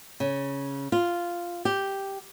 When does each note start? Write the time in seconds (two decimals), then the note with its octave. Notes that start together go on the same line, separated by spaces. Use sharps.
0.20 C#3
0.92 F4
1.65 G4